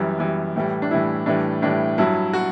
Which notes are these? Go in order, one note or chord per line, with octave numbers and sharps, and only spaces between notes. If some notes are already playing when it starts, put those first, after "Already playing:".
Already playing: F#2 E3 G3
F#2 E3 G3
A2 E3 G3
D4
A2 E3 G3 E4
A2 E3 G3 D4
A2 E3 G3 D4
G2 F#3 E4
F#4